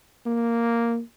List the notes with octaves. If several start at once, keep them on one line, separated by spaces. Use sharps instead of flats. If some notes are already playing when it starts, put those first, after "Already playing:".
A#3